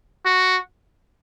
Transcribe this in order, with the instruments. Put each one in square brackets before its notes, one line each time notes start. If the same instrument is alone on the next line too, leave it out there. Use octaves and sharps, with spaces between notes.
[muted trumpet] F#4